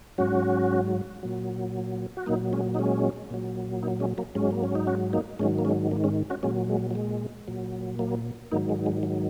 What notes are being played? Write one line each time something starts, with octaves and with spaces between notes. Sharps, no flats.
G#2 F#3 C#4 F#4
A#2 F#3
F#4
A#2 F#3 A#3 D#4
G#3 C#4
D#4
G#3 C#4
A#2 F#3
A#3 D#4
G#3 C#4
F#3 A#3
G#2 F#3 G#3 C#4
A#3
C#4
D#4
C#4 F#4
A#3 D#4
G#2 D#3 F#3 G#3 C#4
A#3
G#3 C#4
F#3 A#3
G#3 C#4
C#4 F#4
A#2 F#3 G#3 C#4
G#3
F#3
G#3
A#2 F#3
F#3 A#3
G#2 D#3 F#3 A#3 D#4
G#3
G#3
F#3